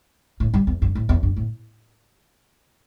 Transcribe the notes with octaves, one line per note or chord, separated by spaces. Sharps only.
A2
G2
E2
G2
A2
E2
G2
A2